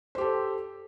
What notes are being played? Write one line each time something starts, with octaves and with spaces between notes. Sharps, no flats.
G4 A4 C5